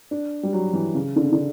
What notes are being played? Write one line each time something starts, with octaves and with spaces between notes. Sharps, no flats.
D4
G3
F#3
E3
C#3
D3
C#3
D3